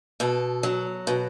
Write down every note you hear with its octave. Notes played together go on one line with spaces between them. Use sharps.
B2 A4
F#3
B2